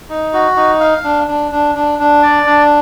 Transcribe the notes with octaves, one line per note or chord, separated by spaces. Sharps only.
D#4
F#4
D#4
F5
D4
D4
D4
D4
D4
D5
D4